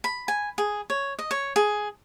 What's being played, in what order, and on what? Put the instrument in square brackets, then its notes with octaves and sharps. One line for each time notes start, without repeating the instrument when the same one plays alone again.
[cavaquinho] B5
G#5
G#4
C#5
D#5
C#5
G#4